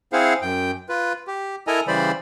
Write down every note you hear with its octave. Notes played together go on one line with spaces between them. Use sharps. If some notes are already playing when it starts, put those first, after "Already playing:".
C4 E4 G#4 C5 F5 F#5
F#2 G5
F4 B4
G4
E4 A4 A#4 D#5 G#5 A#5
C#3 E3 G3 C5 D5 B5